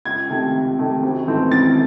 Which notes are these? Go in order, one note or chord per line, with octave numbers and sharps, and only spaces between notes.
C#2 G#6
C3 D#3 A3
C#2
C3 D#3 A3
G#1
G#2 E3 A3 C4
G#1 A6